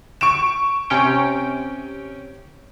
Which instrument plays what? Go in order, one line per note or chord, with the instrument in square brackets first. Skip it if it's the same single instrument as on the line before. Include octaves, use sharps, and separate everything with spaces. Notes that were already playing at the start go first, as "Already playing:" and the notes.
[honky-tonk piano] C#6 D7 E7
[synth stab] C3 C#4 G5